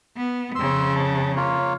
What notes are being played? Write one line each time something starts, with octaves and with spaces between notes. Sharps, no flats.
B3
F2 C#3 C6 E6
A5
A#3 F4 C#5